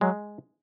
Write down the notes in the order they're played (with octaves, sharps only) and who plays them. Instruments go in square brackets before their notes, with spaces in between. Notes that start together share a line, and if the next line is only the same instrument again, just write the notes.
[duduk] F#3 [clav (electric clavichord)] G#3